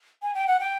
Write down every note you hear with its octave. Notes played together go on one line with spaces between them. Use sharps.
G#5
G5
F#5
G5